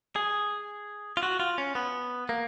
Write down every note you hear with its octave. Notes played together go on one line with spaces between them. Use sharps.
G#4
F4
F#4
F4
C#4
B3
A#3